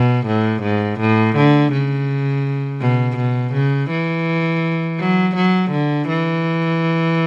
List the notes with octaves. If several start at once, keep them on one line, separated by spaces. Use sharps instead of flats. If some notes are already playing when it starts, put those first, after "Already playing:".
Already playing: B2
A2
G#2
A2
D3
C#3
B2
B2
C#3
E3
F#3
F#3
D3
E3